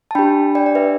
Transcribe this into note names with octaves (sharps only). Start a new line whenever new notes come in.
A5
D4 G4 G5 B5
D5 G5
D5
B4 E5